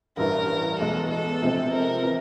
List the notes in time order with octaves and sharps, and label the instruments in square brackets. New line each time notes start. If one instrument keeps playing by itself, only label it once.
[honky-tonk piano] A1 G2 E3 [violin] A#4
[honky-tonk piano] E2 B2 G#3 [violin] A4
[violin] A4
[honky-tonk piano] C3 F3 G#3 C4
[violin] A#4
[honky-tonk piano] E3